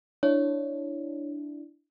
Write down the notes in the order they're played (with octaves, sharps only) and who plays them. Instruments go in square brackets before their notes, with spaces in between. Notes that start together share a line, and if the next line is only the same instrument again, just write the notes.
[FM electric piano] D4 E4 [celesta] C#5